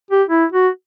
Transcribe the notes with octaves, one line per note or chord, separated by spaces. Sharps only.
G4
E4
F#4